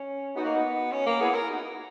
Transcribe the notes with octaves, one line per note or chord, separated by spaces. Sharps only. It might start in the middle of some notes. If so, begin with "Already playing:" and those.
Already playing: C#4
B3 D#4 F#4
A#3
B3
C#4
A#3
B3 E4 G#4
A#4
D#4 F#4